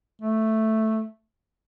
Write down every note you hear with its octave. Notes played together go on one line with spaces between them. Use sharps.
A3